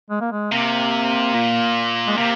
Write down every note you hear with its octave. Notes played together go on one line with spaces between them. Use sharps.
G#3
A#3
G#3
C3 A#3
A#2
G#3
C3 A#3